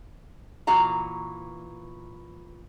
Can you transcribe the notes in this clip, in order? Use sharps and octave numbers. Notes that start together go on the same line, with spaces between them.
A#2 E3 F#4 F5 A#5